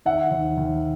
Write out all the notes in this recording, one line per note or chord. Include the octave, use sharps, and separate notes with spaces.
D#3 E5 F#5
D#2
D#2